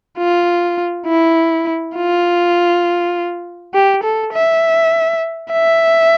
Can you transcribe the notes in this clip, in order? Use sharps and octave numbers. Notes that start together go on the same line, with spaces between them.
F4
E4
F4
G4
A4
E5
E5